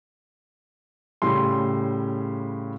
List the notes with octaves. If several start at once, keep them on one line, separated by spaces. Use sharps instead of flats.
A2 C#3 G3 C6